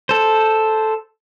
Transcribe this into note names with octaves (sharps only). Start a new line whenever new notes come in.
A4 C5